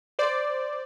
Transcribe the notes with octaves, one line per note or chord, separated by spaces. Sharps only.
C5 D5